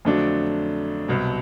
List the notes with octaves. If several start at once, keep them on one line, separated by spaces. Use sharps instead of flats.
F2 D3 F#3 A3 D4
C2 B2 F#3